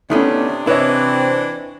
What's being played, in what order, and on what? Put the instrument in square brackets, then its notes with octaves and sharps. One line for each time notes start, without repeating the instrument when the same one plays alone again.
[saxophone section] C3 D4 [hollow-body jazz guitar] D#3 A3 B3 [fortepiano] C#4 E4
[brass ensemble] C3 C4 [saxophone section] E3 D4 [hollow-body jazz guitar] E4 [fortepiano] B4 C#5 D#5